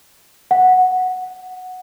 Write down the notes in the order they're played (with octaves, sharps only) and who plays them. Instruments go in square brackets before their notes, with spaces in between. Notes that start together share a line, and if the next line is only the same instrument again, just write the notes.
[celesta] F#5